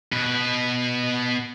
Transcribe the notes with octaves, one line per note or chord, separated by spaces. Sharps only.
B2 B4